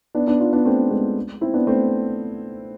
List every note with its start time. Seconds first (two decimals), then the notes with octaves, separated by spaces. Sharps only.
0.15 B3 D4
0.27 B3 D4
0.40 D4 F4
0.53 B3 D4
0.65 A3 C4
0.91 G#3 B3
1.41 C4 E4
1.54 B3 D4
1.67 A3 C4